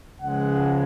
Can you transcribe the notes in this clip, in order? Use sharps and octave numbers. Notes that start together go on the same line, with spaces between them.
C#2 C#3 F3 G#3 F#5